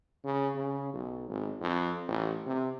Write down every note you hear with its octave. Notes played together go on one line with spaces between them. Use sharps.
C#3
C#3
B1
G#1
F2
A1
C3